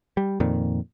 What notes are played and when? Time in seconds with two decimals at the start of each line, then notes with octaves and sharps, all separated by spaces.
0.17 G3
0.40 F2 A#2 D#3